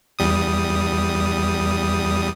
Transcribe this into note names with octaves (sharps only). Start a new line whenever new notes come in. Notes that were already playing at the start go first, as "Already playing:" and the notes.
E2 G3 D#6